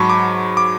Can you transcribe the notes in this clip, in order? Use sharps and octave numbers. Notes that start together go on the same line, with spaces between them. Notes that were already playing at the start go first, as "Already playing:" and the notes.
Already playing: G#2 F#3 A5 B5 C#6
D6
D6